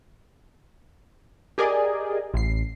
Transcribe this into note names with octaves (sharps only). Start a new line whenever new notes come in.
G4 G#4 A#4 D5 D#5 G#5
A1 C7